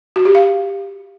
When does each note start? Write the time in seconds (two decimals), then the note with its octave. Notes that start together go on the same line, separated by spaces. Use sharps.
0.16 F#4
0.25 G4
0.35 F5